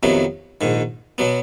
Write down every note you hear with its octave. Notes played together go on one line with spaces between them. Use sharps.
F2 C3 D#3 F#3 B3
A#1 G#2 D#3
B2 F#3 B3